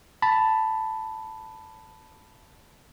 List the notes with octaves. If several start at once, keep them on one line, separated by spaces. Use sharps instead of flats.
A5 B5